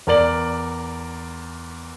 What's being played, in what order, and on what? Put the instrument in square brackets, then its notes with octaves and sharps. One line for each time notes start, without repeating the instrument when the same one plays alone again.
[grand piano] E2 A#4 D5 F#7